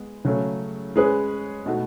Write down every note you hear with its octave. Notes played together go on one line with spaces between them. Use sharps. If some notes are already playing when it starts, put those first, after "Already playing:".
Already playing: G#3 B3
C#3 F#3 A3 C#4
G#3 C#4 G#4 B4
B2 A3 D#4 F#4